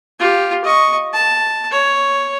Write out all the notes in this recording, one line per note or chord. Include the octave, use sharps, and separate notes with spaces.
F4 G4
D#5 C#6
A5
C#5